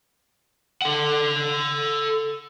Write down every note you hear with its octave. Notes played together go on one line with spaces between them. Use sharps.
A4 F#5